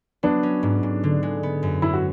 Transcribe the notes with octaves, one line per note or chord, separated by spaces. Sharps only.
F#3 B3 D4
C#4
G#2
G#2
D3
G#3
B3
F#2
F#3 E4
F#4